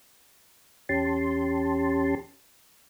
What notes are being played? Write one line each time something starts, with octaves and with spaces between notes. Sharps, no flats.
E2 C#4 G4 A5 C6